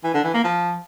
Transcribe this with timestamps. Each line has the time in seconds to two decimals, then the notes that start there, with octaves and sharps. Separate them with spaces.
0.04 E3
0.14 D3
0.24 E3
0.34 A#3
0.44 F3